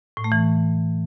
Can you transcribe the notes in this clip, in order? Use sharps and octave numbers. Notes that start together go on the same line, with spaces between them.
A2
A3
E3